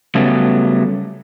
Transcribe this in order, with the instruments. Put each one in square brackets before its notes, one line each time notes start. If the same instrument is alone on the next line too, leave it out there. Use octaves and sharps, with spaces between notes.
[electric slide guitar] C#3 F#3 G3 A3 B3